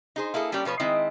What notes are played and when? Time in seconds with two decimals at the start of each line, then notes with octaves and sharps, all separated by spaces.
0.16 D#4 G#4 C5
0.34 A#3 E4 G#4 A4
0.52 G3 A#3 C#4 G4 D5
0.65 B2 F3 B4 C#5
0.80 D#3 G#3 C4 E4 D#5